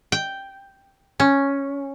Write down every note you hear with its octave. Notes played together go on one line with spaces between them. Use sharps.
G5
C#4